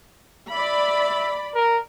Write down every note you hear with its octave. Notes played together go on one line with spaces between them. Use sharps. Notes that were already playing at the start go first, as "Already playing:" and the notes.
D5 E5 B5
A#4